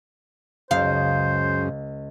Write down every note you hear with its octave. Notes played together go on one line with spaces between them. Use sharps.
C#2 F#2 C#3 C5 F5